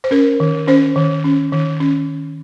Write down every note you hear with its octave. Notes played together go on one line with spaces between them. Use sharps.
C5
C#4 A#4
D#3
C#4 C5
D#3
C#4
D#3
C#4